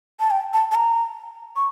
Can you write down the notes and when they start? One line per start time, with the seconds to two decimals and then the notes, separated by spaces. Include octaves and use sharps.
0.20 A5
0.31 G5
0.53 A5
0.71 A5
0.75 A#5
1.56 C#6